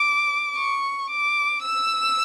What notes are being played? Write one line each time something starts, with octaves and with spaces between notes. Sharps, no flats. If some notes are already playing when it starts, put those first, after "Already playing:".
Already playing: D6
C#6
D6
E6